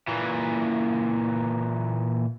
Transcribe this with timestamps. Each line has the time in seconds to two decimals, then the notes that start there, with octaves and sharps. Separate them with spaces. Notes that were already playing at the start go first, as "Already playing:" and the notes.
0.08 A#2 E3